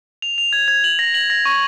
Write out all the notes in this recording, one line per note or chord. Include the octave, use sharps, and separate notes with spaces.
F7
F7
G#6
G#6
F#7
A#6
F#7
A#6
C#6